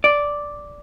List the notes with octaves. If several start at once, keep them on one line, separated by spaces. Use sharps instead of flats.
D5